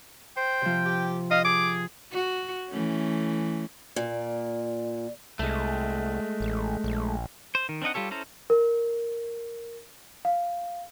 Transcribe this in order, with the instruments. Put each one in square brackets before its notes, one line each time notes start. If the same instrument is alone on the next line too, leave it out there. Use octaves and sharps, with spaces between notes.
[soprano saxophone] C5 [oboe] G5
[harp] C3 F3
[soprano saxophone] G4
[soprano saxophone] D#5 [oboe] F5
[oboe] G#4 [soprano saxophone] D6
[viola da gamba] F#4
E3 A3 C#4
[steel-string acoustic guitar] A#2 [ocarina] D5
[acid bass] C2 [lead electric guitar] G#3 A3
[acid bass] A1
A#1
[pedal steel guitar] C5
D#3
C4 D4 D#4 D#5 F#5
G3 F4 G4 A4 C#5
C#4 E4 A4 C5 A#5
[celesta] A#4
F5